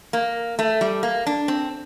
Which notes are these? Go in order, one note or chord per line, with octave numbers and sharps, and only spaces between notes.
A#3
A3
G3
A#3
D4
C4